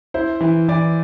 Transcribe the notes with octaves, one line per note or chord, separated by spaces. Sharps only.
E4 C5
E3
E3 D5